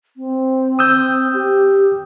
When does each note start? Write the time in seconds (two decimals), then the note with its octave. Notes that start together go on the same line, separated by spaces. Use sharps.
0.17 C4
0.79 D#6 E6 G6
1.34 G4